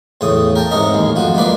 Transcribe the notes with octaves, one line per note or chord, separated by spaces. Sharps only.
E2 A2 C#3 D#6
A#4 G5 A5
G#2 C3 C#4 A#4 D#5
A1 D#2 G#3
F2 F4 F#4
G#3 A#3 F4 B4 D5